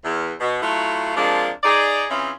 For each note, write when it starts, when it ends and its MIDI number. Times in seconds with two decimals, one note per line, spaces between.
0.04 0.33 40
0.40 0.58 47
0.61 1.14 54
0.61 1.14 57
0.61 1.14 64
0.61 1.14 65
1.16 1.49 48
1.16 1.49 53
1.16 1.49 56
1.16 1.49 58
1.16 1.49 62
1.63 2.04 63
1.63 2.04 68
1.63 2.04 74
2.10 2.30 52
2.10 2.30 60
2.10 2.30 61
2.10 2.30 64
2.10 2.30 65
2.10 2.30 68